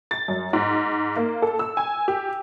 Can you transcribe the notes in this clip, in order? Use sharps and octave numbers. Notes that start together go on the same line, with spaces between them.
A6
F#2
G#2
A#3
A4
E6
G#5
G4